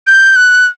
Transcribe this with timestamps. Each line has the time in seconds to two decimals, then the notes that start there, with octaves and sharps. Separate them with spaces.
0.07 G6
0.36 F#6